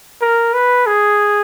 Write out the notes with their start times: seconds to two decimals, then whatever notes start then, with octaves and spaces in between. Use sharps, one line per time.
0.21 A#4
0.54 B4
0.86 G#4